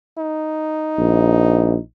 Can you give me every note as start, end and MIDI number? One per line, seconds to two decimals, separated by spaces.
0.18 1.81 63
0.98 1.77 34